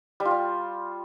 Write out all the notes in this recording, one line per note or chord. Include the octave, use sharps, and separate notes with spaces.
G3
F4
G3